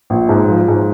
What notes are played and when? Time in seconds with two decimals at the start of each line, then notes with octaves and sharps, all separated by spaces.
0.10 A#1
0.29 G#2
0.49 F3
0.68 G#2